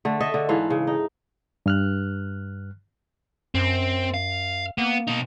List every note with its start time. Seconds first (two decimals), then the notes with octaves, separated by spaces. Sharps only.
0.05 D3 A3
0.20 A4 D#5 E5
0.34 D3
0.49 G#2 E3 A4 F5
0.70 C#3
0.87 D#4
1.66 G2 F6 F#6
3.55 F#2 C4
4.14 F5
4.78 A#3 B3
5.07 B2 D#4